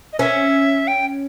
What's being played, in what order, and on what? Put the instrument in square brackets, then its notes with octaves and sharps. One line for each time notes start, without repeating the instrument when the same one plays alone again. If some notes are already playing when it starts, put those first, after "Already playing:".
[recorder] D#5
[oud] C#4 [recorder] E5
[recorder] G5